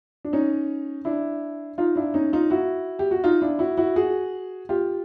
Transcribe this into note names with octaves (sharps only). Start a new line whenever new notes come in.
D4
C#4 D#4
D4 E4
D#4 F4
D4 E4
C#4 D#4
D#4 F4
E4 F#4
G4
F#4
D#4 F4
D4 E4
E4 F#4
E4 F#4
F#4 G#4
F4 G4